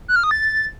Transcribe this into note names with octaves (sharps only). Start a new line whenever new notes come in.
F#6
F6
D#6
A6